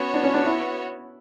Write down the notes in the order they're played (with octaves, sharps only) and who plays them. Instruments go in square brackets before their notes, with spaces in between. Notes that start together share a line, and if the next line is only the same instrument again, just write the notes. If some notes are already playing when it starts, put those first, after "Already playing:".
Already playing: [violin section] B3 F#4 C#5 [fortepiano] C#4
[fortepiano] D4
C#4
D4
E4